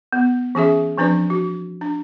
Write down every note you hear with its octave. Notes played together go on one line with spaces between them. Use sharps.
B3
E3 C#4 G#4 E5
F3 C4 D4 B4 D5
F#4
D4